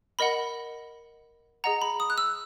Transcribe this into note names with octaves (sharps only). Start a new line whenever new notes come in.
A#4 D#5 F#5 B5
G#4 D#5 F#5 A#5
B5
D#6
F#6
E6